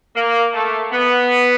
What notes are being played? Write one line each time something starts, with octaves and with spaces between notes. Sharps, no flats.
A#3
A3
B3